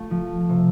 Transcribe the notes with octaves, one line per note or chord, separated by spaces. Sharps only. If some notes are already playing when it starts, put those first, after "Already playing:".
Already playing: A3 F4
F3
C3